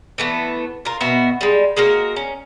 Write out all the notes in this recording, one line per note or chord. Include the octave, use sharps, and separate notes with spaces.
E3 A3 B3
F4 A#4
B2 B3 F#4 E5
G3 G#3
G#3 A#3 F#4 A#4
C#4